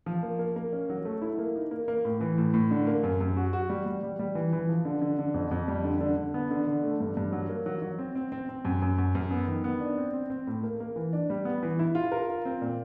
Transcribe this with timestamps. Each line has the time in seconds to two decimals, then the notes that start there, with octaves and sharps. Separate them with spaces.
0.06 F3
0.23 A#3
0.39 A#3
0.56 A#3
0.73 C#4
0.89 F#3
1.05 A3
1.22 E4
1.39 A#3
1.55 D#4
1.71 A#3
1.88 A#3
2.05 A2
2.21 E3
2.38 A2
2.54 A2
2.71 D3
2.87 A#3
3.03 F#2
3.21 F#2
3.37 F#4
3.53 F#4
3.70 G3
3.86 G3
4.03 G3
4.19 G3
4.35 E3
4.53 E3
4.69 F3
4.85 D3
5.02 D3
5.19 D3
5.34 F2
5.51 F2
5.68 G3
5.84 D3
6.01 D3
6.17 D3
6.34 B3
6.51 D3
6.67 D3
6.84 A3
7.00 G2
7.17 G2
7.33 F#3
7.49 A#3
7.66 F#3
7.82 F#3
7.99 C4
8.15 C4
8.32 C4
8.49 C4
8.65 F#2
8.82 F#2
8.98 F#2
9.15 F#2
9.31 B3
9.47 D#3
9.64 B3
9.80 D4
9.98 C4
10.13 C4
10.30 C4
10.47 A2
10.63 A#3
10.80 A#3
10.96 E3
11.13 D4
11.30 G3
11.45 B3
11.63 E3
11.79 E4
11.95 F4
12.12 A#4
12.29 F4
12.45 C4
12.62 A#2